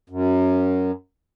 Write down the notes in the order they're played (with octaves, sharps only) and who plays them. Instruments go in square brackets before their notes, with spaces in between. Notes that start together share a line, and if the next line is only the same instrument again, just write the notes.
[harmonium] F#2